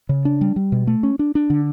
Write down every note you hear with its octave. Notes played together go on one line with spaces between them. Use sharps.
C#3
D4
G3
G3
B2
A3
C#4
D4
D4
D3